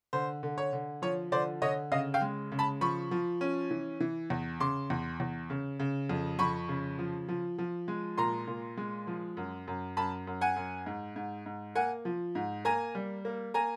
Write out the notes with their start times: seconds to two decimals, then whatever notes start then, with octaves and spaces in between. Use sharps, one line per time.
0.13 D3 C5
0.43 D3
0.58 C#5
0.73 D3
1.02 F3 C#5
1.32 D3 C5 D5
1.62 D3 C#5 D#5
1.92 C#3 D#5 F5
2.14 F5 G5
2.21 G#3
2.52 C#3
2.59 A5 B5
2.81 F3 B5 C#6
3.11 F3
3.41 C#4
3.71 E3
4.00 E3
4.30 E2
4.60 C#3 C6 D6
4.90 E2
5.20 E2
5.50 C#3
5.80 C#3
6.09 F2
6.39 F2 B5 C#6
6.69 C#3
6.99 F3
7.28 F3
7.58 F3
7.88 G#3
8.17 A#2 A#5 C6
8.47 A#2
8.77 G#3
9.07 F3
9.37 F#2
9.68 F#2
9.97 F#2 A5 B5
10.27 F#2
10.41 F#5 G#5
10.56 F#2
10.86 G#2
11.16 G#2
11.46 G#2
11.75 A#3 F#5 G#5
12.05 F3
12.35 G#2
12.65 A#3 G#5 A#5
12.95 G3
13.25 A#3
13.54 A#3 G#5 A#5